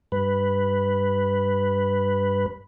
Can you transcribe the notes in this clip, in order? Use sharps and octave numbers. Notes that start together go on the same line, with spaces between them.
G2 B4